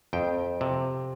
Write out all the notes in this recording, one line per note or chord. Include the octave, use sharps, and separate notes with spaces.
F2 G5
C3